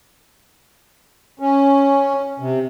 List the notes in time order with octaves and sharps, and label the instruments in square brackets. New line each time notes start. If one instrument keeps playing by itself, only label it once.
[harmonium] C#4
C3